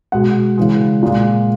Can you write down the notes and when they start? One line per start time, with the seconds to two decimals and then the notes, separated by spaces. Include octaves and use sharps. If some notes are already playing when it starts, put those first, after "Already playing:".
0.12 B2 G#3 F#5
0.57 C#3 E3 G#3
1.03 A#2 G#3